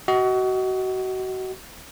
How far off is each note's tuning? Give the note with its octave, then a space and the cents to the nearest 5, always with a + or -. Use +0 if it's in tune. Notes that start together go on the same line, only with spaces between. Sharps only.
F#4 +25 D#5 +25